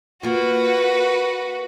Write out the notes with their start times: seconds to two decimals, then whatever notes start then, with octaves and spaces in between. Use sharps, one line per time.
0.23 A#3 F4 F#4 B4